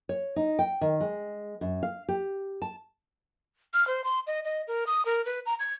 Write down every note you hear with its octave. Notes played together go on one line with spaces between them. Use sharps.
C#5
D#4
G5
D#3
G#3
F#2
F5
G4
A5
F6
C5
C6
D#5
D#5
A#4
D#6
A#4
B4
A#5
G#6